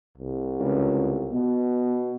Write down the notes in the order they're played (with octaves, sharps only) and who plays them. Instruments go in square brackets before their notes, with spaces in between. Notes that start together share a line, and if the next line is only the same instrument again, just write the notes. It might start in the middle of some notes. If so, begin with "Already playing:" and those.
[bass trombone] C2
[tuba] C#2
[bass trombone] B2 [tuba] B3